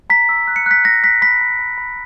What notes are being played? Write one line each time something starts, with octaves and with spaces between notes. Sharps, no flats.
A#5 B6
E6
F#6
C#7
F#6 B6
F#6 A#6
F#6 B6
B5 B6
B5
B5
B5